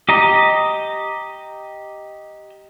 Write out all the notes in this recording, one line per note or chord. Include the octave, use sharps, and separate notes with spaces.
G4 D#5 A#5